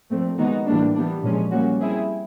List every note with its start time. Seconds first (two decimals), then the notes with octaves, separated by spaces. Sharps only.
0.11 A#2 F3 A3 C4
0.39 D#3 G#3 B3 D#4 F#4
0.67 A2 E3 G3 A#3 D4
0.95 E3 G3 B3 D4
1.24 A#2 F3 G#3 C#4
1.51 G3 A#3 C#4 F#4
1.80 G3 C4 E4 G#4